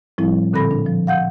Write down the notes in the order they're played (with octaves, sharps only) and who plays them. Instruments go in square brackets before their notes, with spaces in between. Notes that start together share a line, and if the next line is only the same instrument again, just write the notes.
[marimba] A2 F3 G3 C4 E4
A#2 D3 C4 A4 B5 A#6
D4
F3
F5 F#5 G6